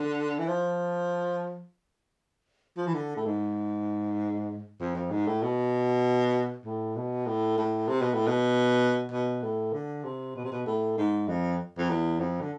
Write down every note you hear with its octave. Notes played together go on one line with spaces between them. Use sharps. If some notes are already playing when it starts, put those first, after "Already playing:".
Already playing: D3
E3
F3
F3
E3
D3
A2
G#2
F2
F2
G#2
A2
B2
A2
B2
A2
A2
C3
B2
A2
B2
B2
A2
D3
C3
B2
C3
B2
A2
G#2
F2
F2
E2
F2
D3